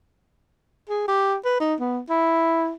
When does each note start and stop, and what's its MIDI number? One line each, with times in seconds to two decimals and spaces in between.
0.89 1.07 68
1.08 1.36 67
1.45 1.56 71
1.60 1.75 63
1.80 2.00 59
2.10 2.72 64